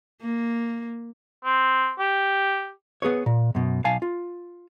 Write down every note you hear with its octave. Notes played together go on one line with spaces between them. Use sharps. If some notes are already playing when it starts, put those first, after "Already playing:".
A#3
C4
G4
B3 G#4 B4 C#5
A#2
F#2 B2
B1 F5 G#5 A5
F4